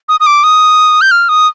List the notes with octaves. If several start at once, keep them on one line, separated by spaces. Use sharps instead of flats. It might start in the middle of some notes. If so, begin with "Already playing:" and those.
D#6
D#6
D6
D#6
G6
F6
D#6